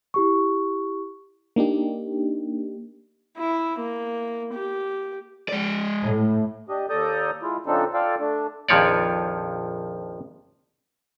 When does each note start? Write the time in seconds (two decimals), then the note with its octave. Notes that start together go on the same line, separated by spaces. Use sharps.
0.14 E4 G4 C#6
1.56 A#3 D4 D#4 G4
3.37 E4
3.79 A#3
4.54 G4
5.49 G#3 D5
6.05 A2
6.69 D4 G4 D#5
6.90 D#2 A4 D5 A#5 D#6 G6
7.42 G#3 E4 F4
7.66 C#3 F3 C4 D4 D#4 A4
7.94 F4 A4 D5 F5 G5
8.19 A3 D4
8.69 A#1 F2 D#3 F3 C#5 D5